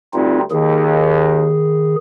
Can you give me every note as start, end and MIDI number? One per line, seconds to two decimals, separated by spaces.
0.14 0.42 38
0.14 0.42 43
0.14 0.39 60
0.14 0.39 63
0.14 0.39 65
0.51 1.54 39
0.51 1.95 51
0.51 1.95 68